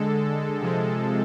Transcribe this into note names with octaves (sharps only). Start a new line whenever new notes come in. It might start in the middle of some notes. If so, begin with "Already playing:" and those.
Already playing: D3 G#3 A4
C3 F3 G#3